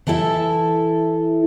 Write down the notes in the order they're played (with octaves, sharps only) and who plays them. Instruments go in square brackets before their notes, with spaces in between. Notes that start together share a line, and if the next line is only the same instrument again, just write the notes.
[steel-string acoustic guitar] E3 E4 A4 E5